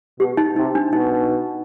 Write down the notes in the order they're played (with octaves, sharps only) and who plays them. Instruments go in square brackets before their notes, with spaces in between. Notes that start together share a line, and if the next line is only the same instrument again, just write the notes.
[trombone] B2 [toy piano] G4
[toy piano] D#4
[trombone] C3 [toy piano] D#4
[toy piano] D4
[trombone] B2 [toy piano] D#4